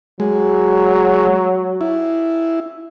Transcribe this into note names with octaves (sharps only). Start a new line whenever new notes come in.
F#3 G#3
E4